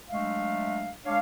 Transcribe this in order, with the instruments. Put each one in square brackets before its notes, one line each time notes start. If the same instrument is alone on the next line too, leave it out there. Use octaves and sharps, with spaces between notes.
[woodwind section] F#3 G#3 A3 D4 E5 F5
G#3 D4 C#5 F5